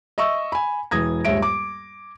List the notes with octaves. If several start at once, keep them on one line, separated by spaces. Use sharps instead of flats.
D#5 E5 C#6 E6
G#5 B5
E1 E3 D#6 G#6 A#6
D#1 G2 G#3 C#5 E5 D7
D6